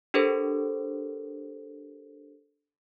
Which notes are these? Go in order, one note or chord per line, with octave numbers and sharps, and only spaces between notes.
D4 G4 A4 A#4 C5